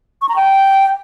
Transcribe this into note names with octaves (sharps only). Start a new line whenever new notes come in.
C#6
A#5
G5